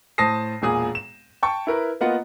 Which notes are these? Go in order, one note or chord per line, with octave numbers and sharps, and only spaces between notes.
A2 C5 A5 D#6 A#6 C7
E1 A#2 G#4 D#6
E7
G5 A5 C#6
E4 A#4 B4
A#3 B3 F4 D#5 F#5